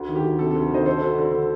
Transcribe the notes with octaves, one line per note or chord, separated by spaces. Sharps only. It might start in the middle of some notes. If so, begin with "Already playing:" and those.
Already playing: D2
D#3
G4
D2
C3 A4
A4
D2
D#3 C5 D#5
D2 A4 C5
D2
D3
D3